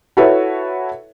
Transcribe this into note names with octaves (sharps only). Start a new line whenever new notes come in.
E4 F#4 A4 B4 C#5 E5